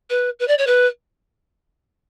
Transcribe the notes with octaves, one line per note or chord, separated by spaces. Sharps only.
B4
B4
D5
C#5
B4